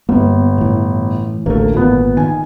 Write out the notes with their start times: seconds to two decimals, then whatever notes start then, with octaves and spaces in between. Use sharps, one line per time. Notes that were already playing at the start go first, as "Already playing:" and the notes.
0.09 G1 A#3 B3
0.58 A2 E3
1.46 A1 D2 D3 A3 A#3
1.74 G#1 A#2 B3
2.17 D#3 G#5